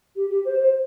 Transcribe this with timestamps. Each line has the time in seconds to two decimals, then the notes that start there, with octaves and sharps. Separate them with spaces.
0.16 G4
0.30 G4
0.45 C5
0.60 C5